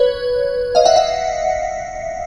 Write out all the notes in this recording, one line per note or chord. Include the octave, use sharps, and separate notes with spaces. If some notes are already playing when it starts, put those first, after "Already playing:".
Already playing: B4 C#5
D#5 F5
E5 F#5
E5 F#5